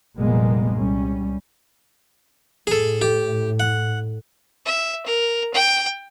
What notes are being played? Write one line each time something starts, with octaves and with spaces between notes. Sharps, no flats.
F1 A#2 G3 G#3 A#3 B3
C2 G3 C#4
A2 G#4 A4
G4 A4
F#5
E5
A#4
G5